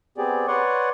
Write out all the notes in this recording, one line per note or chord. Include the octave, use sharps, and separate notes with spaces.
B3 C4 G4 G#4 D5
B4 C#5 D5 F#5 C6 C#6